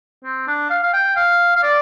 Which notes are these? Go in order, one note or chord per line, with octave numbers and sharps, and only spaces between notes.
C4
D4
F5
F5
G5
F5
F5
D5